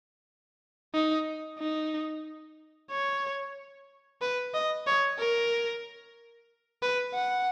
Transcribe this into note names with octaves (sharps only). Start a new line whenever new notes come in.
D#4
D#4
C#5
B4
D#5
C#5
A#4
B4
F#5